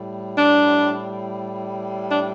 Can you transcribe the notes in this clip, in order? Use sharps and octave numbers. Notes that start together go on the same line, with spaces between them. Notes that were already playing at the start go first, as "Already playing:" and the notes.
Already playing: A2 G3
D4
D4